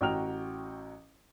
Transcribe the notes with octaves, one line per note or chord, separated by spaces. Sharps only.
A1 F#4 G5 A#5 F6 F7